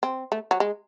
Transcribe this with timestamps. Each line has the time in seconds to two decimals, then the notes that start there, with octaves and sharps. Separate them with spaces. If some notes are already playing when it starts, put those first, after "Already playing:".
0.03 C4
0.32 A3
0.51 F#3
0.60 G#3